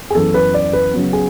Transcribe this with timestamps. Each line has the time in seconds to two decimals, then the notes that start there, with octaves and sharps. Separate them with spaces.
0.10 G#4
0.15 F#2 E3 B3 A4
0.34 B4
0.54 D5
0.73 B4
0.93 C#3 F#3 B3
1.13 G#4